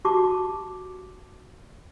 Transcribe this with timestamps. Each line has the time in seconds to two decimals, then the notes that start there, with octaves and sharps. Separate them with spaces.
0.05 F#4 G4 A5 C#6 D6